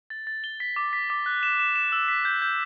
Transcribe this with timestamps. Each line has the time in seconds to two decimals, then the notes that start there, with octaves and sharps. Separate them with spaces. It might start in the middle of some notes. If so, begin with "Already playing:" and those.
0.10 A6
0.27 A6
0.44 G7
0.60 B6
0.76 D6
0.93 B6
1.10 D6
1.26 F#6
1.43 E7
1.59 E7
1.76 E7
1.92 E6
2.08 B6
2.25 G6
2.42 G6